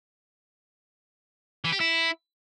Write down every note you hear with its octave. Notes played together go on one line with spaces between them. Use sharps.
E3
G4
E4